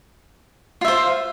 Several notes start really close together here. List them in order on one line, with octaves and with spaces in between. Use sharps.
F4 E5 C5 F5